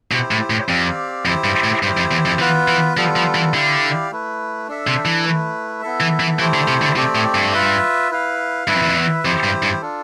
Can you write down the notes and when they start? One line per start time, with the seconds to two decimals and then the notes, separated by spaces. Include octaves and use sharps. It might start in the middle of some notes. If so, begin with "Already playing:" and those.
0.11 B2 E4 G4 C5
0.31 A2
0.50 A2
0.68 F2 C4 G4 D5 F5
1.25 F2 E4 G4 C5
1.44 G2
1.64 A2
1.83 G2 E4 G4 C5
1.97 F2
2.11 E2
2.26 F2
2.39 E3 B3 F4 B4
2.68 E3
2.97 F3 G3 B3 F4 A4
3.16 F3
3.35 E3
3.54 D3 E4 G4 D5 F5
4.11 A3 E4 B4
4.68 D4 A4 E5
4.87 C3
5.05 E3
5.25 A3 E4 B4
5.82 B3 E4 A4 E5
6.00 E3
6.20 E3
6.39 E3 A3 E4 G4 C5
6.54 D3
6.68 C3
6.82 D3
6.96 C3 A3 C4 G4 D5
7.15 A2
7.35 G2
7.53 F4 B4 E5
8.11 E4 B4 F5
8.68 G2 E4 B4 E5
8.75 F2
8.82 E2
8.89 F2
8.96 E2
9.24 F2 E4 G4 C5
9.43 G2
9.62 G2
9.81 D4 F4 A4